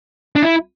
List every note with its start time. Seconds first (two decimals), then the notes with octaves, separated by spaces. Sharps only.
0.36 D4
0.42 E4